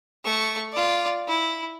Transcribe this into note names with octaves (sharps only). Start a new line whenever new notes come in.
A3 C#6
F4 D5
E4